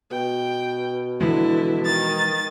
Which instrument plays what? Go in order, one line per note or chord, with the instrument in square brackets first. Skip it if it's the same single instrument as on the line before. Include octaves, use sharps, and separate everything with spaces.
[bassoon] B2 [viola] G5
[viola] D3 E4 [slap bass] E3 F3 G#3
[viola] D#3 [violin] A6